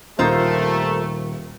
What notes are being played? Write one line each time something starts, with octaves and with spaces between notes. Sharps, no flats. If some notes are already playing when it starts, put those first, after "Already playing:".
D#1 A3 D#4 F4 G4 A4 A#4 C5